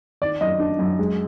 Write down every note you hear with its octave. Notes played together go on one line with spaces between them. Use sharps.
D#3 D5
F#2 D#5
D4
F#2
G#3